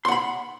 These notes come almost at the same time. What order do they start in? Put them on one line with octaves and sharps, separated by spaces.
C6 F#5 B5